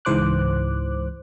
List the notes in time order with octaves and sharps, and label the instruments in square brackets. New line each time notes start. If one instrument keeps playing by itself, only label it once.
[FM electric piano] C#2 G#2 E3 C5 D6 F#6